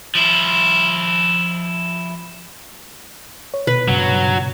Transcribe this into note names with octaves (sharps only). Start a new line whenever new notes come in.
F3 E4
C#5
B2 B4
G2 C#3 F#3